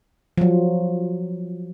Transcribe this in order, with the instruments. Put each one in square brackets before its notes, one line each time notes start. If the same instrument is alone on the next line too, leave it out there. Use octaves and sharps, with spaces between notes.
[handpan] F3 F#3